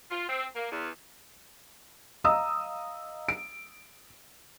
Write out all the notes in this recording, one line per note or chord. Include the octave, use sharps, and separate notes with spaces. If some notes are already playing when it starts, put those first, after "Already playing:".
F4
C4
A#3
E2
D#5 F5 A#5 D#6 E6
D7